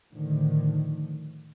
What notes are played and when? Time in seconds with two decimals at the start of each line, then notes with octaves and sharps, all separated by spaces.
0.12 A2 D3 D#3 F3